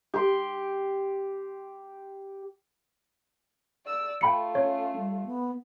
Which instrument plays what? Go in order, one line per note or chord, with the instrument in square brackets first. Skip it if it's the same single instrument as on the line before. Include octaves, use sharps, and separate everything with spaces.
[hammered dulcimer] G4 C6
[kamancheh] D5 E6
[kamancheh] A3 F4 [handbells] G5 B5 C#7
[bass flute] C#4 [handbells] C#5
[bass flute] G3
B3